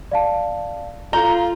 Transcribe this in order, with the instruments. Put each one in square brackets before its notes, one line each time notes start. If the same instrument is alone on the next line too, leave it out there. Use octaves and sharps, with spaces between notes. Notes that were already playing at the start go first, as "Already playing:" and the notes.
[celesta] D5 F5 A5
[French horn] F4 [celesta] A4 G6 G7 [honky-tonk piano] A#5